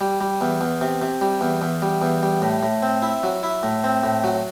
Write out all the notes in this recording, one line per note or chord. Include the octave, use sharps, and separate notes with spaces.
G3
G3
E2
E2
C3
C3
G3
E2
E2
G3
E2
G3
A2
A2
C4
E4
F#3
E4
A2
C4
A2
F#3